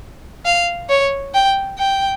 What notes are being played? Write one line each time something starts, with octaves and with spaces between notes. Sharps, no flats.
F5
C#5
G5
G5